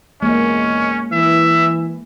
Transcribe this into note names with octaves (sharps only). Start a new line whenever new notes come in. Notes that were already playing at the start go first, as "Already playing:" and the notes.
E2 G#3 A#3 C#4 D#5
E3 E5